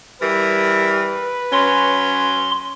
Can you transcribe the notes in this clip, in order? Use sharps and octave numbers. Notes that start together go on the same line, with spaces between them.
E3 G3 A#4 B4
F#3 C#4 C6